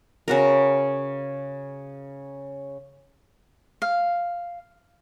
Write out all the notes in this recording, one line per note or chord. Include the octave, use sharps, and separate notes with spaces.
C#3 F#4 A#4
F5